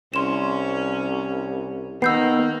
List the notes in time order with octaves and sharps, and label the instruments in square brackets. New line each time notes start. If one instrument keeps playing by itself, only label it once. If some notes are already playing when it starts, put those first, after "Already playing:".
[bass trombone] C2 [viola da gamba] C#4 [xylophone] C6 E7
[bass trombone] D#3 [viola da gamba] A#3 [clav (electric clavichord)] B3 [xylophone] E6 G6 C7